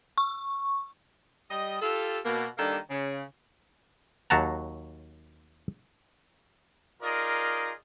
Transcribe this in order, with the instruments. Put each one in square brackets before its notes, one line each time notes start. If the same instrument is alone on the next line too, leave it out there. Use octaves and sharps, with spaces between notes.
[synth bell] C#6
[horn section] G3 D#5
F4 G4 A4
B2 A#3
D#3 G3 A#3 D4 A4
C#3
[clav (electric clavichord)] D#2 F#3 F#4 F#5 A5 A#5
[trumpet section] D#4 F4 G#4 A#4 D5 D#5